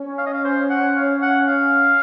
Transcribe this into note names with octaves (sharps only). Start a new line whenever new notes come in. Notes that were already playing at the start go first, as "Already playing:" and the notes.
Already playing: C#4
F5
D#5
F5
C5
F#5
F5
F#5
F5